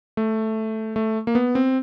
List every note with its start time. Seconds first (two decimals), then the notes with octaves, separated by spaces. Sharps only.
0.17 A3
0.96 A3
1.27 A#3
1.35 B3
1.55 C4